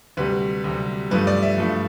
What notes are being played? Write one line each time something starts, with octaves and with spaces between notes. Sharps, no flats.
D2 C3 G3 B4
D2 C3 G3
G2 F3 A3 B4
D5
E5
G2 F3 A3